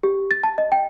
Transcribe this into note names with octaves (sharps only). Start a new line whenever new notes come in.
G4
A6
A5
D#5
G5